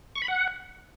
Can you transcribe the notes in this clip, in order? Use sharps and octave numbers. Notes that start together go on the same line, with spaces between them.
C#6
B5
F#5